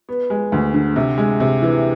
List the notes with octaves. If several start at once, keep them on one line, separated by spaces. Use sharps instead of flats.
B3
G#3
D2
D3
C3
G#3
C3
E3